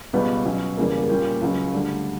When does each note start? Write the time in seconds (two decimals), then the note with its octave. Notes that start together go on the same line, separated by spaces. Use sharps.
0.13 C#2 B2 G3 B3
0.45 B2 F#3 C#4
0.77 F#1 E2 C#3 G3 A#3
1.09 A#2 G3 C#4 G4
1.41 C#2 C#3 F#3 C#4
1.74 D2 D3 G3